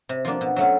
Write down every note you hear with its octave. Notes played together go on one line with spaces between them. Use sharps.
C3
F3 A#3 D4
B2
F#3 A3 C#4